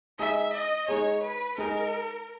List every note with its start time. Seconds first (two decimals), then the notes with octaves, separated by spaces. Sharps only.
0.19 G#3 D#4 G#4 E5
0.53 D#5
0.88 G#3 D#4 G#4 C#5
1.23 B4
1.58 G#3 D#4 G#4 A#4